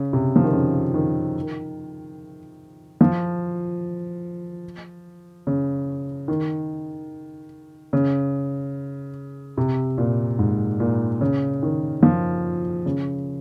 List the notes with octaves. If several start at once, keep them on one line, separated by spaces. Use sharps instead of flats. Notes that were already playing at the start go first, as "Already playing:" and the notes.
Already playing: C#3
C3
F3
D#3
C#3
D#3
F3
C#3
D#3
C#3
C3
A#2
G#2
A#2
C#3
D#3
F3
C#3